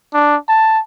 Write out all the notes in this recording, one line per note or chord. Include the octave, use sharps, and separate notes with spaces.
D4
A5